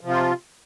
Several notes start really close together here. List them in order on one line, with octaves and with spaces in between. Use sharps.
F3 C3 F4